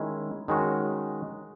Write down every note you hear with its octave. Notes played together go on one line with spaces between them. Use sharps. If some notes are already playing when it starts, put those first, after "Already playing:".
Already playing: D#3 G#3 C#4 E4
D#3 G#3 C#4 F#4